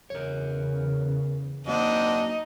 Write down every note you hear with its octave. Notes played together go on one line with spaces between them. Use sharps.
E2 C#3 A#4 C#5
F#3 A#3 C4 D4 D#4 D#5 F#5